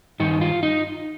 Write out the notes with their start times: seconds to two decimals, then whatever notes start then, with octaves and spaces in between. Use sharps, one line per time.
0.20 G2 D#3 D#4
0.41 F4
0.63 D#4